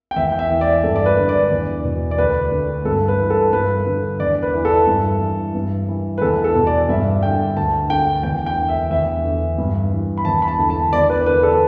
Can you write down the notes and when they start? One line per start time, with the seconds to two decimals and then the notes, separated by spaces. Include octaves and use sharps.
0.11 G5
0.16 E2 E5
0.32 G5
0.39 E5
0.50 E3
0.61 D5
0.84 G2 A4
0.96 D5
1.06 B4
1.17 D3
1.29 D5
1.51 E2
1.84 B2
2.11 D5
2.18 D2 B4
2.52 D3
2.85 G2 A4
3.08 B4
3.19 E3
3.30 A4
3.53 G2 B4
3.87 D3
4.20 E2 D5
4.43 B4
4.54 E3
4.65 A4
4.87 G2
5.21 E3
5.55 G2
5.88 E3
6.18 B4
6.22 E2 A4
6.44 A4
6.55 B2
6.67 D5
6.89 G2 E5
7.23 D3 G5
7.56 D2 A5
7.90 D3 G5
8.23 E2 G5
8.46 G5
8.57 D3
8.69 E5
8.91 E2 E5
9.25 D3
9.58 G2
9.92 E3
10.18 B5
10.25 E2 A5
10.42 B5
10.48 A5
10.59 D3
10.70 A5
10.93 E2 D5
11.10 B4
11.26 D3 B4
11.43 A4